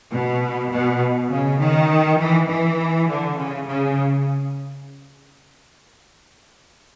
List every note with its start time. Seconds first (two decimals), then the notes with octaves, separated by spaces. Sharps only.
0.12 B2
0.71 B2
1.30 C#3
1.60 D#3
2.19 E3
2.49 E3
3.08 D3
3.37 C#3
3.67 C#3